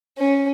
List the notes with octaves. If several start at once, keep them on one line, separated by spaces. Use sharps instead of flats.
C#4